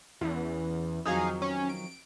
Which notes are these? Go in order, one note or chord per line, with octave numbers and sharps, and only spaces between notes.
E2 E3 C#4
F2 D#3 F#3 D#4 G#4 F5
C#4
D7